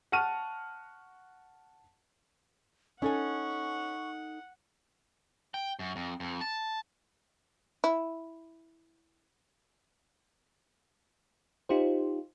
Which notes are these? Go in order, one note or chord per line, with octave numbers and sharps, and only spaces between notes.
F#5 A5 C#6 F6 D#7
C#4 D#4 A4 F#5 G#5 C#6
G5
F#2
F2
F2
A5
E4
D#4 F4 G4 C5